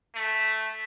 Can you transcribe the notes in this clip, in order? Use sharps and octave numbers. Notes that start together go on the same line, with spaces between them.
A3